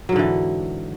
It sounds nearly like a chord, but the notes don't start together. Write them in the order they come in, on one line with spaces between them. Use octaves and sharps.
F#3 G#2 D3 E3